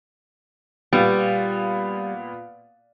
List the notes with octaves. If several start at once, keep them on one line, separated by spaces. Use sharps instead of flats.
A#2 G3 B3